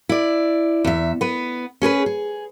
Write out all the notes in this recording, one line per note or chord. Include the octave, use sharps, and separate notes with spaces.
E4 D5
E2 E5
B3 B4
C#4 G#4 A#4 B4
G#4